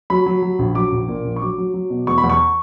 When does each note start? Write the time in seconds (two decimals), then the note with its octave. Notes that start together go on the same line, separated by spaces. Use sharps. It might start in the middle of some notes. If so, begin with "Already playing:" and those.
0.10 F#3 B5
0.26 F#3
0.42 F#3
0.59 A#1
0.75 F#3 D6
0.92 A#1
1.08 A#2
1.25 A#1
1.36 C#6
1.41 F#3 D6
1.58 F#3
1.74 F#3
1.90 B2
2.07 E2 C#6
2.18 B5
2.23 E2
2.30 C#6